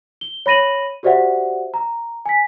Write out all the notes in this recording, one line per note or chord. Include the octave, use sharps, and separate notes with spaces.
G7
C#5 B5 A#6 D#7 F#7
F#4 G4 C5 D5 E5 F#5
A#5
G#5 B6